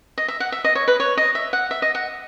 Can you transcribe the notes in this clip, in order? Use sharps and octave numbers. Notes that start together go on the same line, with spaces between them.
D#5
E5
F#5
E5
D#5
C#5
B4
C#5
D#5
E5
F#5
E5
D#5
F#5